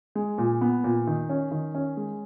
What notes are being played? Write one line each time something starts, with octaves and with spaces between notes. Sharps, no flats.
G#3
A#2
B3
A#2
D#3
C#4
D#3
C#4
G#3